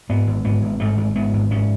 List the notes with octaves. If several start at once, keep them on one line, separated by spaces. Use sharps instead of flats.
G#2 B3
G#1
G#2 B3
G#1
G#2 A3
G#1
G#2 B3
G#1
G#2 C#4